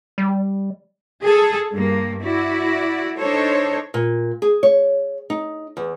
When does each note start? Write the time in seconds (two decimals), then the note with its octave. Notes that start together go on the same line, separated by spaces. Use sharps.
0.18 G3
1.22 G#4 A4
1.74 G2 A#3
2.23 E4 F#4 D5
3.17 D4 D#4 A4 C5 C#5
3.94 A#2
4.42 G#4
4.63 C#5
5.30 D#4
5.77 E2